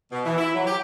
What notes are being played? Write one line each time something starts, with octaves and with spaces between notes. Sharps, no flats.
B2
E3
E4
F#3
G4